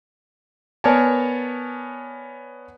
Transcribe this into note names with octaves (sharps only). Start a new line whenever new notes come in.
B3 A#4 C#5 D5 G#5 A5